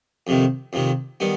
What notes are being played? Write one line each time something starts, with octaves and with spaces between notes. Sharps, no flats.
F2 C3 D#3
F2 C3 D#3
D#3 G3 B3